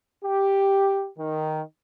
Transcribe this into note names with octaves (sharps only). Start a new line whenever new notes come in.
G4
D#3